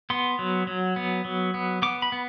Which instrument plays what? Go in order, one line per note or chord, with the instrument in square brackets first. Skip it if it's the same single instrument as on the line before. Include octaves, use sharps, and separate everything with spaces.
[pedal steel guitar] B3 C6
F#3
F#3
B3
F#3
B3
B3 D6
B5
B3